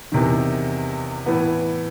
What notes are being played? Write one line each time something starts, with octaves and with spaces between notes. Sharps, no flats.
E2 C3 D#3
A2 E3 B3